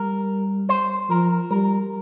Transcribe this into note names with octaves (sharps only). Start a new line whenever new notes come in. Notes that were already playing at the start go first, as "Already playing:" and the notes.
Already playing: G3 A#4
C5
F3 A#4
G3 A#4